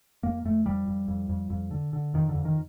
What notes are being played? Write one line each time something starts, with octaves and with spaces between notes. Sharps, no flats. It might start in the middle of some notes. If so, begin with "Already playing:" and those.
F2 A#3
F2 A3
F2 G3
F2
F2
F2
F2
D3
D3
F2 D#3
D3
F2
D#3